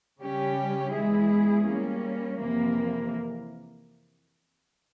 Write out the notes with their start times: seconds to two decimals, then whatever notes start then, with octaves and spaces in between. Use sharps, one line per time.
0.22 C#3 G3 C#4 G4
0.94 E2 E3 G#3 E4 G#4
1.67 G3 A#3 C#4
2.40 F2 C3 E3 A#3